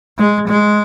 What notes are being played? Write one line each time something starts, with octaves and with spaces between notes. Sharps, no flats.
G#3
G#3